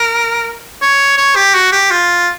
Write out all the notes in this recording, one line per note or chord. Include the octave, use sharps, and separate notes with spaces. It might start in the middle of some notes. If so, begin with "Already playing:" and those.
Already playing: A#4
C#5
C#5
G4
F#4
G4
F4